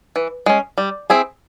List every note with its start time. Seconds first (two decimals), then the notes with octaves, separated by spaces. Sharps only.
0.16 E3
0.46 G#3 C#4
0.78 G3
1.10 C4 E4 G#4